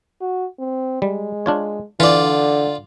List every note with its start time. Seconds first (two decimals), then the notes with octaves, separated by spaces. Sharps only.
0.21 F#4
0.60 C4
1.02 G3 G#3
1.46 D4 F4 C#5
2.00 D3 E3 F4 D5